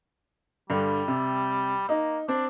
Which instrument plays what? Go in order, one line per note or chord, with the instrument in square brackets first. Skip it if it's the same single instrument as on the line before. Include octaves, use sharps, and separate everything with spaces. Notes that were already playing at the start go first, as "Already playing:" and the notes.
[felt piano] G2 D3 [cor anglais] G3
[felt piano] C3
[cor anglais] A#3 [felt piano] D#4
[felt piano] C4 [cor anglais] D4